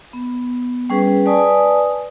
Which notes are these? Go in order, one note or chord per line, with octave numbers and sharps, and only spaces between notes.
B3
G3 C#4 G#4 B4
B4 D5 G#5 A5 D#6